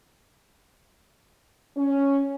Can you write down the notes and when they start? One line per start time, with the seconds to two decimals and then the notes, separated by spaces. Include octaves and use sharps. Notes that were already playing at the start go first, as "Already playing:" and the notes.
1.77 C#4